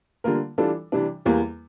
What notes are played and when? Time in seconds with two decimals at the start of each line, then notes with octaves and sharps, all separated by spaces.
0.24 D3 G3 A#3 F4 A#4
0.58 E3 G3 D4 F4 A4
0.92 C3 E3 G3 D4
1.25 E2 E3 G3 A#3